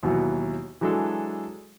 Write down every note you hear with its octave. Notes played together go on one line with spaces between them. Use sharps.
D#2 B2 E3 F#3
E3 F#3 G#3 D4 A4